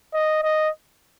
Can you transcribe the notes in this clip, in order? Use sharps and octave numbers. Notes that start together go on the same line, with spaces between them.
D#5
D#5